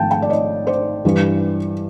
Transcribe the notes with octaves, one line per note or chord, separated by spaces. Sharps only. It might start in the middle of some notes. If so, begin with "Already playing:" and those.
Already playing: G#1 G#2 F3 A3 G5 A5
G5 A5
D5
C#5 D#5
C5 D5
G2 E3 G3